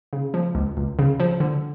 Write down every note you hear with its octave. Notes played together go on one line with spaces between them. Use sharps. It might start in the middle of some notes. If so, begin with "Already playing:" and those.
C#3
F3
C#2
C#2
C#3
F3
D3